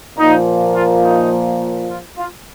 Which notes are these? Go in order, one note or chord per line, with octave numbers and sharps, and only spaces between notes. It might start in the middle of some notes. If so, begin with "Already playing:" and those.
A#2 F3 A#3 D#4
F4
D#4
F4
F4